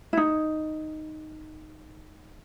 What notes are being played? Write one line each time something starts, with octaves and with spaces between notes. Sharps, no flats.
E4
D#4